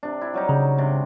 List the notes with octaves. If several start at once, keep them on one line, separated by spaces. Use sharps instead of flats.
C3 D4
E4
F#3 G3 D#4
C#3
G#2 C3 D4